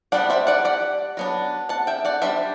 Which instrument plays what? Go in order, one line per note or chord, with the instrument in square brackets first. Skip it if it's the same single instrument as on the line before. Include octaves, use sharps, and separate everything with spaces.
[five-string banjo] G3 B3 D4 D5 F#5
C5 E5
D5 F#5
D5 F#5
F#3 B3 D4
F#5 A5
E5 G5
D5 F#5
G3 D4 C5 E5